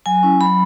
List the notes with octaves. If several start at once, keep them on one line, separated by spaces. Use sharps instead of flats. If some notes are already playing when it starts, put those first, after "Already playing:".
F#3 G#5
C#4 E4
F#3 B5